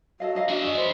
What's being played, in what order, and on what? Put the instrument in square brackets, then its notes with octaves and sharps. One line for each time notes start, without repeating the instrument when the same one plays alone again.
[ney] F#4 [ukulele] A4 D#5 F5
[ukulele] D#4 D#5 F5
[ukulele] D4 [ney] F#4 [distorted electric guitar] G#4 E5
[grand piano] D#5
[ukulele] B4 C5